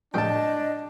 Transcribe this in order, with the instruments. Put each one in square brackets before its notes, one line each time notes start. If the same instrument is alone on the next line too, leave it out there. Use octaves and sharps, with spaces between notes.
[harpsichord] F2 A2 C#3 [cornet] D4 [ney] D#5 [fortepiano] G5 A5